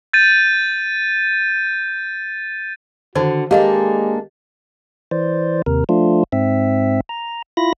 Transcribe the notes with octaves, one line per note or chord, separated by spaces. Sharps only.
G6 A6 D#7
D3 D#3 F#4 C5
G#3 A#3 D4 G4 A4 D#5 F5
E3 C5 D5
D#2 C3 A#4
F3 A3 D4 F4
G#2 C4 E5
A#5
E4 F4 B5 A#6